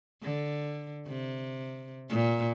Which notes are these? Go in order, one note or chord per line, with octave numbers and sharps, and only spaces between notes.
D3
C3
A#2